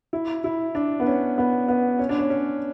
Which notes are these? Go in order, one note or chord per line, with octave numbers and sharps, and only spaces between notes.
E4
E4
D4
B3
C#4
B3
B3
C#4
D4
C#4
C#4